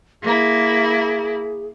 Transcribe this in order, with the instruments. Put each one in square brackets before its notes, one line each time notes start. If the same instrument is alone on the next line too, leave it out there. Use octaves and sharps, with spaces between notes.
[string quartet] A#3 E4 [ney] G#4